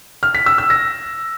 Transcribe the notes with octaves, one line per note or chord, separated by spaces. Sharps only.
F6
B6
E6
E6
A#6